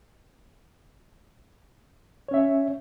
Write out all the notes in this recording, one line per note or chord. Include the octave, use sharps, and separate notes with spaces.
C#4 C#5 E5